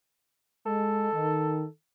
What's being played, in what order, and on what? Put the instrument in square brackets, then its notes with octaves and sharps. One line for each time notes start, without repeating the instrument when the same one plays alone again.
[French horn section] G#3 [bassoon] A4
[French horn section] D#3